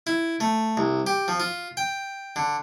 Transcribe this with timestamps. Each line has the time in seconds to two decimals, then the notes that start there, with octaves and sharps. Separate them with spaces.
0.07 E4
0.40 A3
0.77 C2
1.07 G4
1.28 F3
1.40 F4
1.77 G5
2.36 D3